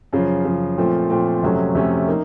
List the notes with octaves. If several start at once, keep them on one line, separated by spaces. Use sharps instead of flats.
F#2 C#3 F3
F#2 C#3 F3
A#2 F3 A3 C4
A#2 F3 A3 C4
F2 C3 F#3 A3 C#4
F2 C3 F#3 A3 C#4
A#3 D#4